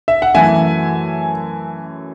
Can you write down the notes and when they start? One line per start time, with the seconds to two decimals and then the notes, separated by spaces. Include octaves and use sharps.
0.08 E5
0.22 F#5
0.35 F#2 E3 A3 E5 G#5